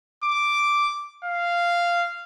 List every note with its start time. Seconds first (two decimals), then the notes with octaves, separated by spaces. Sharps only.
0.24 D6
1.25 F5